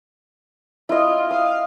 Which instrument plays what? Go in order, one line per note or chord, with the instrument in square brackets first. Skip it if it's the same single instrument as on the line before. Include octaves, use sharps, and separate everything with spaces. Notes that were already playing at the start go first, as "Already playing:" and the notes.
[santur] E4 D#5 [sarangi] F4
[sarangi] F5 [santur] D#6